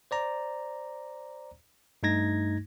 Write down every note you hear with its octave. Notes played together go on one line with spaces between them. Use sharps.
C5 D5 A#5
G2 A3 D#4 G#6 A#6